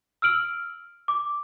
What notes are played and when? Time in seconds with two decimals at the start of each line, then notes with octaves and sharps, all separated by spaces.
0.22 E6 F6 D7 F#7
1.08 D6